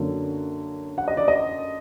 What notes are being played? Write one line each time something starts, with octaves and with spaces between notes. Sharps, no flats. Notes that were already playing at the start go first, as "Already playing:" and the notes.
Already playing: F#2 D3 F#3 A#3
F#5
D#5
D5
D#5